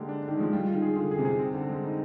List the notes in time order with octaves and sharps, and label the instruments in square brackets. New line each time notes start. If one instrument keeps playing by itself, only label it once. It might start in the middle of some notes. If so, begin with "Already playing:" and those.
Already playing: [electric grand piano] D3 G#3 G4 [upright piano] A#3
[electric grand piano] D4
D4
[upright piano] D#3
[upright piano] F3 [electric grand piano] G#3
[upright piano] G3 [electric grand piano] F4
[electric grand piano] F4
[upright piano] D#3
[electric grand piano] G#4
[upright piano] D3 [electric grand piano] F4
[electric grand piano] G#4
[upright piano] C3
[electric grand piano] G#4
C4
D3
G#3
D#4